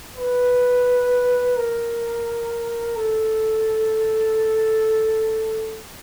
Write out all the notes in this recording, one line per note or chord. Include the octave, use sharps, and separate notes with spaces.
B4
A#4
A4